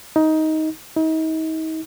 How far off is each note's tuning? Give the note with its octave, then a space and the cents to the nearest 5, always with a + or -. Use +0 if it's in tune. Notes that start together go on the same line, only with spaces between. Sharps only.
D#4 +15
D#4 +40